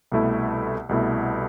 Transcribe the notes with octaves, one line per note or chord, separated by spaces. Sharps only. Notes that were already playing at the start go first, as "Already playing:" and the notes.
C2 B2 A3 E4
C2 B2 A3 E4